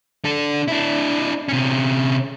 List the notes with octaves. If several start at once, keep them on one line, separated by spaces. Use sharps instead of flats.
D4 A4
D4 E4
C3 C#4